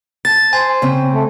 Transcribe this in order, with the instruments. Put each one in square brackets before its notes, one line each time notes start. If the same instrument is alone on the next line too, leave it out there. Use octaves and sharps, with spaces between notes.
[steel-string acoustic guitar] A5 [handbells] A6
[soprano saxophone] C5 [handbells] G#5
[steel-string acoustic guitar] C#3 C4
[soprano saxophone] A3